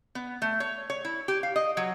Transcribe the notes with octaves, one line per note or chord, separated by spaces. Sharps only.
B3
A3
C#5
C#5
E4
G4
F5
D#5
F#3